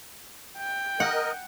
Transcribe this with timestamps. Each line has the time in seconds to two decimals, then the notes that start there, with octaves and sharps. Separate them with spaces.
0.58 G5
1.00 A#4 D#5 F#5